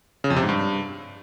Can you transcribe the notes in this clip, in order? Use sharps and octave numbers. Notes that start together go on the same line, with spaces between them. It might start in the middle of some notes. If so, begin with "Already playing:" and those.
C#3
F2
C3
G#2
G2